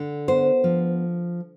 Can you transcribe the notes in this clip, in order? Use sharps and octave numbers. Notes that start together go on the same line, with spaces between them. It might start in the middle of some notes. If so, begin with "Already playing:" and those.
Already playing: D3
B3 C5
F3